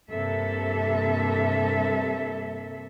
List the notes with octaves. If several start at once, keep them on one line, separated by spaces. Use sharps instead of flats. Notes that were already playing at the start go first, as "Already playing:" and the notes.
G2 C3 A#3 A4 E5